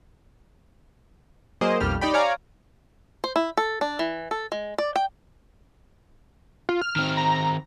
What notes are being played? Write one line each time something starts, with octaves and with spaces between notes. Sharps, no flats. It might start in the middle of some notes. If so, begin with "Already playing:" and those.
F#3 A#3 G#4 A#4 C5 D#5
B1 F2 G3 G4 F6
D#4 G4 D5 G5 B5
C#5 D5 F5 G#5 A#5
C5
E4
A4
D4
E3
A4
G#3
D5
G5
F4
F6
D#3 C4
A#5